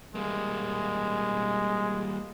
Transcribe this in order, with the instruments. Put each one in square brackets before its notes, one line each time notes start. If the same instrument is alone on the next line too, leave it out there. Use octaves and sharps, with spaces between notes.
[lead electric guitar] G3 A#3 [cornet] G#3